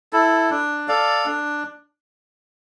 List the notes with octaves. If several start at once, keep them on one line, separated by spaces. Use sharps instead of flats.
E4 A4
D4
A4 D5 F5
D4